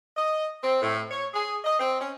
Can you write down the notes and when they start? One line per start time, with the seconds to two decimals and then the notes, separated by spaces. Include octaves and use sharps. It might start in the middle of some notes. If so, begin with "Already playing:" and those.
0.17 D#5
0.62 C4
0.82 A2
1.11 C#5
1.34 G#4
1.65 D#5
1.79 C4
1.99 C#4